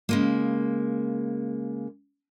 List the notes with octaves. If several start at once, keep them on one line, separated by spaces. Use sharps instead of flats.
C#3 G#3 A#3